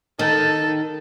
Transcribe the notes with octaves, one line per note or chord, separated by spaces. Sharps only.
D#3 A4